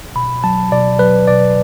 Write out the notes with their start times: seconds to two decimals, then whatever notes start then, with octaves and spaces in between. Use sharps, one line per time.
0.15 B2 B5
0.44 F#3 A5
0.72 B2 D5
0.99 F#3 B4
1.27 B2 D5